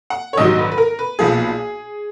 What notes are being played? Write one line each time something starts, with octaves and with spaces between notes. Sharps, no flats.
F#5
C#5
A#1 G#2 D#3 F#3 D#5
B4
B4
A#4
B4
B1 A#2 F3 B3 G#4